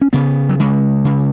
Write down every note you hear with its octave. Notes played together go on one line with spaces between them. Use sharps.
C#4
C#3 B3
F#3
C#3 G#3
C#3